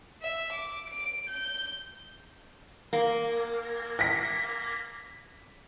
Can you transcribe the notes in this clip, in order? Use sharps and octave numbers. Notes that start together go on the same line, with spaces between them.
E5
D6
D7
G6
A#3
A#6 B6